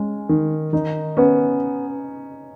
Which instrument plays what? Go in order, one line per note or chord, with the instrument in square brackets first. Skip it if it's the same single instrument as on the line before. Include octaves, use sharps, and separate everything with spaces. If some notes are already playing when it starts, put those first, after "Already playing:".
Already playing: [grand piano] G#3 [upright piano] C#4
[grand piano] D#3
[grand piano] D#3 [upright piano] D#4
[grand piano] B3 [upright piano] C#4